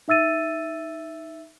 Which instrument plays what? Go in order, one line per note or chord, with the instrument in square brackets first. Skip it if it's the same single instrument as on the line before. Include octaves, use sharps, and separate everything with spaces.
[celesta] D#4 E5 E6 A6 D#7